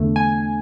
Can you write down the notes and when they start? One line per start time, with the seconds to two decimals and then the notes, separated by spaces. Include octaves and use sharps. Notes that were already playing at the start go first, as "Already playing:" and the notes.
Already playing: E2 D3 A3
0.16 G#5